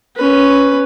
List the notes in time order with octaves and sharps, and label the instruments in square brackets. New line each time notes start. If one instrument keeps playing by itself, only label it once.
[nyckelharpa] C#4 B4